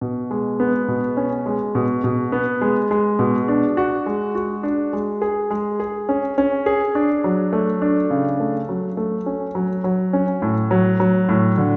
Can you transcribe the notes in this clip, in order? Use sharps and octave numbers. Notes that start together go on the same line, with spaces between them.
B2
G#3
B3
B2
C#4
G#3
B2
B2
B3
G#3
G#3
B2
D4
F#4
G#3
F#4
D4
G#3
G#4
G#3
G#4
C#4
C#4
G#4
D4
F#3
A3
D4
C#3
A3
F#3
A3
C#4
F#3
F#3
C#4
A2
F#3
F#3
A2
D3